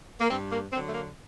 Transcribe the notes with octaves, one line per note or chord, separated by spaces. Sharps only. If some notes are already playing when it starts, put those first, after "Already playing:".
A#3
G2 C4
A#3
D3 F#3 C4
A3
A#3